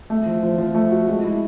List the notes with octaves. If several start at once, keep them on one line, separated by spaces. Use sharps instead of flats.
A3
F3
F3
F3
A3
F#4
G#3
E4